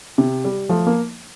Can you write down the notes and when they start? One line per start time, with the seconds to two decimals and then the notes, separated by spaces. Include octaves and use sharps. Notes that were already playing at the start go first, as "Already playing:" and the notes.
0.18 C3
0.44 G3
0.69 F3 A3
0.87 A#3